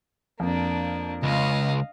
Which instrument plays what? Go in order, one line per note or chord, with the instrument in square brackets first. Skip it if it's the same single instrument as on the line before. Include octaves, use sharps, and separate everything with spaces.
[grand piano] F2 [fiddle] A#3 D4
[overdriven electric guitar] C#2 [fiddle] D#5 F5